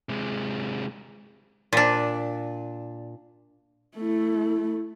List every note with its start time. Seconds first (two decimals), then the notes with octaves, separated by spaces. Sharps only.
0.09 C3 G#3
1.73 A#2 D4
3.97 A3 E4